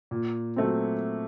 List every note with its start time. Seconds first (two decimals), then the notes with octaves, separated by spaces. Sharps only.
0.11 A#2
0.56 F#3 A3 C4